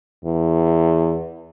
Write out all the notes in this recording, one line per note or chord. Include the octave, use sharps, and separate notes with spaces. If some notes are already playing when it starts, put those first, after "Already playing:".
E2